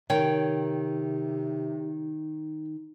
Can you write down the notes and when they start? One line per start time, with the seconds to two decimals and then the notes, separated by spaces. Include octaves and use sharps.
0.10 C3 D#3 C#5 G5